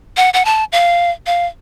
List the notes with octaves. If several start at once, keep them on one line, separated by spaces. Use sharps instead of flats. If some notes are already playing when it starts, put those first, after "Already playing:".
F#5
F#5
A5
F5
F5